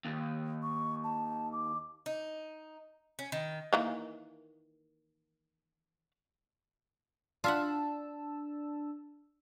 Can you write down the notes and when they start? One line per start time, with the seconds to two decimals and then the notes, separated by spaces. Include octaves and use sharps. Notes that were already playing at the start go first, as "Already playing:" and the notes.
0.05 D#2
0.63 C#6
1.04 A5
1.52 D6
2.06 D#4
3.19 C#4
3.32 D#3
3.73 D#3 E3 A#3
7.44 D4 F4 E5 F#5 A5 E6